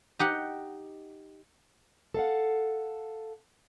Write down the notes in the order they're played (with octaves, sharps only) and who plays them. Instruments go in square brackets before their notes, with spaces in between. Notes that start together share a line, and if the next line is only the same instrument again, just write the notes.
[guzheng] D#4 G4 F#5
[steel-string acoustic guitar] A4 F5 F#5